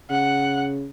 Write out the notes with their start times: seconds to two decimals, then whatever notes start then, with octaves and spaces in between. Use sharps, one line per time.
0.10 C#3 F#5